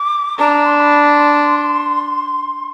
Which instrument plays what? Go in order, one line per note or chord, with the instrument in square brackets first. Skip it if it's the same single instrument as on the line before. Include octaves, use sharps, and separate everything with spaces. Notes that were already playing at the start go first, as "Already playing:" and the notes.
Already playing: [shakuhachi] D6
[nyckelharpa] D4 [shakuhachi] A#5
[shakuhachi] C6
C6
B5
C6